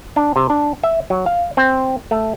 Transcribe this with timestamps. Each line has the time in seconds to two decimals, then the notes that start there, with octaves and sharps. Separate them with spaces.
0.16 D4
0.36 C3
0.50 D4
0.83 E5
1.10 F#3
1.26 F5
1.57 C4
2.11 A3